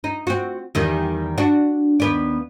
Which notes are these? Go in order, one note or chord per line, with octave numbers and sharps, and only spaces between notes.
D#4
C4 F#4
E2 D#3 G3
D4 F#4
D#2 B3 D5